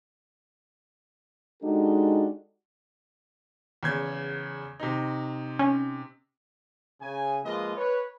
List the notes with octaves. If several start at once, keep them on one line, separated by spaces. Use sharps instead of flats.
G#3 D4 D#4 F#4 G4 A4
E2 C#3 G#6
C3 D#4
C#4
C#3 G#5
F3 G#3 A#3 F4 B4 D#5
B4 C#5